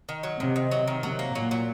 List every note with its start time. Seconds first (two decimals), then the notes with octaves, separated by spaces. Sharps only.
0.09 D#3
0.23 F#3
0.40 C3 D#3
0.56 D#3
0.72 F#3
0.87 D#3
1.03 C3 F#3
1.19 A#3
1.35 A#2 F#3
1.51 F#3